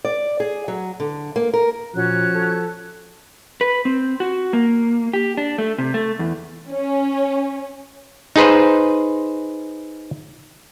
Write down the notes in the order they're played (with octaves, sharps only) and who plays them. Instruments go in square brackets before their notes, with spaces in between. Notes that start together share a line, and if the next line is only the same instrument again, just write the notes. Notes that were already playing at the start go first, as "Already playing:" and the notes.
[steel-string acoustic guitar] D5
G#4
F#3
D3
A#3
A#4
[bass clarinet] A#2 [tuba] F3 [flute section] C#4 F#4 F#6
[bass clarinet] A4
[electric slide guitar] B4
C4
F#4
A#3
G4
D4
A3
C3
A3
E2
[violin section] C#4
[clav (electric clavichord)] D#4 G#4 B4 C5